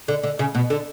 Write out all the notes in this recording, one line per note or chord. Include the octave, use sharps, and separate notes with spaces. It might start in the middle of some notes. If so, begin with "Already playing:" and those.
D3
D3
C#3
B2
D3